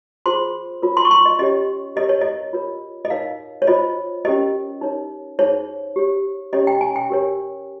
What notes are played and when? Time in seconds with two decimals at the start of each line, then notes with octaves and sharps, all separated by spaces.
0.26 F4 G#4 C5 C6
0.82 F4 A#4 C#5
0.97 C6
1.05 C#6
1.11 C6
1.26 D#5
1.39 C#4 G4 C#5 D#5
1.96 G4 A#4 C#5 D#5
2.09 C#5
2.21 D#5
2.53 F4 A#4 C#5
3.05 D#5
3.10 D#4 A#4 C#5 F5
3.62 C#5
3.67 F4 C5 D#5
4.25 C#4 G4 A#4 C#5 D#5
4.81 D#4 A#4 C#5
5.39 D#4 G#4 C5 C#5
5.96 G4 C#5
6.53 C#4 G4 C#5 D#5
6.67 G5
6.81 G#5
6.96 G5
7.10 G4 A#4 C#5